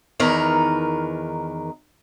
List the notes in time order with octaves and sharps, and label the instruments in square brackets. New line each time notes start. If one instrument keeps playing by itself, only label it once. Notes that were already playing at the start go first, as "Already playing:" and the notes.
[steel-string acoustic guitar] E2 D#3 A#4 B4 A#5